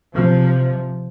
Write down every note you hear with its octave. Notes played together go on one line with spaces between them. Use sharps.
C3 F3